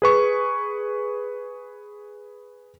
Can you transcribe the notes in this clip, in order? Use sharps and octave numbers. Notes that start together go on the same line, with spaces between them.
G#4 B4 C#6